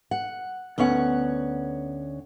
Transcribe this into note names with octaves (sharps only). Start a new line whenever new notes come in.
F#5
D2 B3 C#4 C#5 F#5